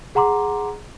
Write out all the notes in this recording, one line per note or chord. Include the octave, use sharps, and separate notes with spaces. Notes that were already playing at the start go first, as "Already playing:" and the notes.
G#4 F#5 A#5 C6 D6